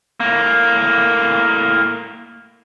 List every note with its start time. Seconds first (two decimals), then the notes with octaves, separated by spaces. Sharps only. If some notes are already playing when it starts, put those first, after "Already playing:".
0.20 A2 A#3